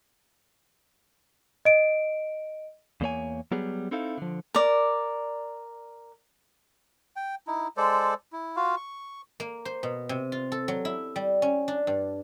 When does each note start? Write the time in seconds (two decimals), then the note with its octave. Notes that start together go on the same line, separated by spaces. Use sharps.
1.65 D#5 D7
3.01 E2 A#3 C#5 G#5
3.51 F#3 G3 B3 G#4
3.91 C4 D#4 E4 A4 F5
4.18 D3 F3
4.55 A#4 D5
7.16 G5
7.47 D#4 E4
7.77 G#3 A4 C5 D5
8.33 E4
8.56 F4 F#4 F5
8.77 C#6
9.40 A#3
9.65 C5
9.83 B2
10.09 C3
10.32 F4
10.52 A4
10.68 F#3
10.85 E4
11.16 G3
11.42 C#4
11.68 D4
11.87 G2